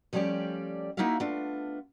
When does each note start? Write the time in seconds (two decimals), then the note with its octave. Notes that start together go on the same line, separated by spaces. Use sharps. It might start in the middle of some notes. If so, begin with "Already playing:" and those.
0.13 F3 G3 A3 C#4 G4 D5
0.97 A#3 D#4 E4 F#4 E5 F5
1.20 A3 B3 D4 F4